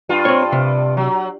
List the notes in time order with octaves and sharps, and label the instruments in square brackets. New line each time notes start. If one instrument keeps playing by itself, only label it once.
[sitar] G2 F4
[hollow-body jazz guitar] C4 C#5
C3
[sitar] F#3